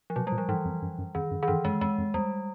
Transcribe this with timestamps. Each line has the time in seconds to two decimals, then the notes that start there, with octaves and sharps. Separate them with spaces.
0.10 F3
0.16 B2 F#3
0.27 G3
0.32 A#2
0.38 F3
0.48 G#2 E3
0.65 F2
0.82 F#2
0.98 F#2
1.15 F2 D#3
1.31 F#2
1.43 D#3
1.48 G2 E3
1.64 F#2 G#3
1.81 F2 G#3
1.98 F2
2.14 E2 G3